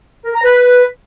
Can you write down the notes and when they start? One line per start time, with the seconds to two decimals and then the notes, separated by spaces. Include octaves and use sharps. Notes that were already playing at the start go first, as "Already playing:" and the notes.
0.25 A#4
0.34 A#5
0.43 B4